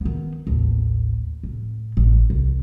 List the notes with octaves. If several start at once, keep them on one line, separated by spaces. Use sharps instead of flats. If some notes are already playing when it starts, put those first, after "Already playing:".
D#3 B3
A1 D#2
A2
A1
C2